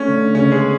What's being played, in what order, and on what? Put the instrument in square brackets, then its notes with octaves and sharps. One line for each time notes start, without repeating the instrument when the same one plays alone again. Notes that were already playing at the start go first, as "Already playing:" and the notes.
Already playing: [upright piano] A3 [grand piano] C#4
[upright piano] D3
[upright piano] C#3 [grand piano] C#4
[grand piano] G#3 G#4
[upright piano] B3